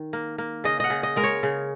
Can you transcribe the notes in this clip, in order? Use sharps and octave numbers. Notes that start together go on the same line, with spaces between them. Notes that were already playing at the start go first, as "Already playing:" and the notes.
Already playing: D#3
A#3
A#3
C#3 D#5
D#5 F#5
C#3
D#5
G#3 A#4
C#5
C#3